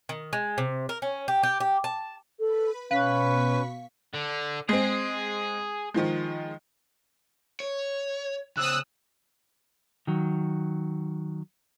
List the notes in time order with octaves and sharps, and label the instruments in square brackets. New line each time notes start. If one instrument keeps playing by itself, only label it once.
[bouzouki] D#3
G#3
C3
A#4
C#4
G4
G4
G4
A5
[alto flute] A4 [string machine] B4 B5
[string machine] B2 C#6 B6 [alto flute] C#4 [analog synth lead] B4 [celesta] F5
[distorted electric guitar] D3
[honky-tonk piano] G#3 C4 [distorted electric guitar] G#4
[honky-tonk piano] D#3 F3 G#3
[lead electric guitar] C#5
[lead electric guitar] C#3 C5 [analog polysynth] D#6 E6 F#6
[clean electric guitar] D#3 F#3